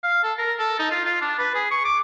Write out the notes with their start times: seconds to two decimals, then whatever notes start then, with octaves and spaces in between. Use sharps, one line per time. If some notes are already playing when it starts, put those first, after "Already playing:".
0.03 F5
0.23 A4
0.38 A#4
0.59 A4
0.79 D#4
0.91 F4
1.05 F4
1.21 D4
1.39 B4
1.54 G#4
1.71 C#6
1.85 D6